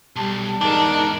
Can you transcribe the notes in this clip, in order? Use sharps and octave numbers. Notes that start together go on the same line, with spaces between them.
B1 G3 A5
E2 G#2 D4 D#4 A#4